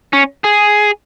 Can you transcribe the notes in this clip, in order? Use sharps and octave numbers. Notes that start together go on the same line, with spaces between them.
C#4
G#4